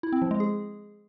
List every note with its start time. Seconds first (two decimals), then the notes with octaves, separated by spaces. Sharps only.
0.03 E4
0.13 C4
0.22 F3
0.31 G#3
0.40 G#4